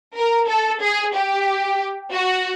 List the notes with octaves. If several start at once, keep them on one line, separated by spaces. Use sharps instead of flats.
A#4
A4
G#4
G4
F#4